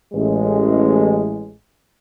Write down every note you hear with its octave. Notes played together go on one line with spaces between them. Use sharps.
A1 G#3